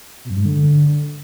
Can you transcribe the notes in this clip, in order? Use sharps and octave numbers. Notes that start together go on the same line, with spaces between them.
B2
F#2
G2
G#2
D3